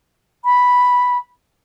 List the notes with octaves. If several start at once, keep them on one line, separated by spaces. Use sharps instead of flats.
B5